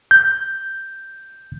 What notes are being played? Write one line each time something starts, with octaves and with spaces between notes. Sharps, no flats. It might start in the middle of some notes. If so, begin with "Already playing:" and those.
G6